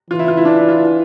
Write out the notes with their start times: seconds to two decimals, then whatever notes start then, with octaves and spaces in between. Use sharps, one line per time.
0.10 E3 F4
0.19 E4
0.28 F4
0.37 E4
0.45 D4
0.57 E4
0.69 F4